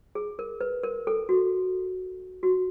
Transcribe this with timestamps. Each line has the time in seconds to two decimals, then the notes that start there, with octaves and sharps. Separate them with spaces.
0.15 G#4
0.39 A#4
0.61 B4
0.83 A#4
1.07 A4
1.29 F#4
2.43 F#4